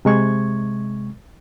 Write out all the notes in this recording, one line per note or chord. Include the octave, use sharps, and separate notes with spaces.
C3 G#3 C#6 G#6